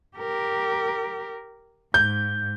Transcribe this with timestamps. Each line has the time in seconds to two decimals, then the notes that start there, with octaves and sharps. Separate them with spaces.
0.17 G4 A#4
1.94 G#2 G6